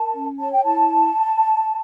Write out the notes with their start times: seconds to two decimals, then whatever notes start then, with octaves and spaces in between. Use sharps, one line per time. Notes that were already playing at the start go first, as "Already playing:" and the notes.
Already playing: A#4 A5
0.14 C#4
0.39 C#5 A5
0.52 G5
0.64 E4 A5